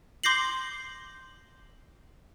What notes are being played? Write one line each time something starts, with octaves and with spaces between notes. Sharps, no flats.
C6 D6 G6 A#6 C7 F#7